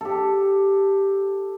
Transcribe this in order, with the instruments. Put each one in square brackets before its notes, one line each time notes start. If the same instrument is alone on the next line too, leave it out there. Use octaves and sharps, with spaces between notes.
[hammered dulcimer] G4 A4